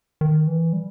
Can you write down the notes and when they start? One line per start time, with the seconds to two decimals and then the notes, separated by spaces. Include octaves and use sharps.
0.21 D#3
0.48 E3
0.73 G3